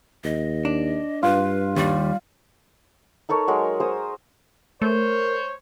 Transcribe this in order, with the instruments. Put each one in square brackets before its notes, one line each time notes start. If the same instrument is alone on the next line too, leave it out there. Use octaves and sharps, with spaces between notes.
[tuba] D#2 [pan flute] D#5
[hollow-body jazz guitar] D4
[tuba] G2 [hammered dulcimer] F4 [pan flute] B4
[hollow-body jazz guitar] D#2 [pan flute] G3
[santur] D#4 A4 A#4 C#5
F#3 G#3 A#4
G#4 A#4 C5 D#6
[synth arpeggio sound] A3 [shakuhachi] A#4 [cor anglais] C5 [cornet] C#5